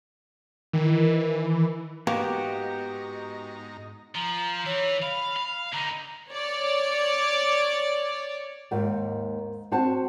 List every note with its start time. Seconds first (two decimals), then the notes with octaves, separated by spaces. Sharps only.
0.73 D#3 E3
2.07 G#2 A#3 B3 D#4 F#4 G4 A#5
4.15 F3 A#5
4.65 E3 C#5
5.02 F5 B5
5.37 F5
5.74 D3 D#4 A#5
6.30 C#5 D5
8.71 D#2 G#2 D#3
9.72 C4 F#4 C5 A5